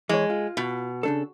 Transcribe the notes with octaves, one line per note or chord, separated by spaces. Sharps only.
E3 G#3 C#5
F4
B2
C#3 D4 A4